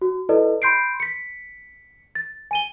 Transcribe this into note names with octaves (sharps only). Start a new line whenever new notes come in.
F#4
E4 A4 B4 D5 D#5
B5 C6 G6 C7 D7
B6 C#7
A6
G#5 D#7 G7